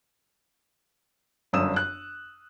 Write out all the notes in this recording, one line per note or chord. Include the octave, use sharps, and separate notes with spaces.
G1 F#2 D4 D#6 E6 E7
F#6